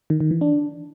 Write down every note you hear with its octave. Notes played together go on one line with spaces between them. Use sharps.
D#3
D#3
E3
D4